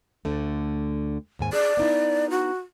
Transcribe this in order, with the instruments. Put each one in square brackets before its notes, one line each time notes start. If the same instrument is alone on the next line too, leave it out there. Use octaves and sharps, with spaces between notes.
[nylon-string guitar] D2 D3 A3
D#2 G#2 G#5
[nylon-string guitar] G#4 [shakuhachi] D5
[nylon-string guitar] B3 D#4 E4
[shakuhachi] F#4